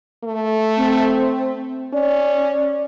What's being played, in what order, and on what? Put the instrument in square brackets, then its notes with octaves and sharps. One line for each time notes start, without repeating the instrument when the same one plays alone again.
[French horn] A3
[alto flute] C4
[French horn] C#4 [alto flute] D5